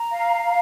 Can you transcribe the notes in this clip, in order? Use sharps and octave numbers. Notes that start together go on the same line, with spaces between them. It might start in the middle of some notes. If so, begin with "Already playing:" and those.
Already playing: A#5
F5